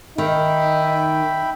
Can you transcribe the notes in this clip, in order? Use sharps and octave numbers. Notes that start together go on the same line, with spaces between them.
D#3 D#4 E5 G5 B5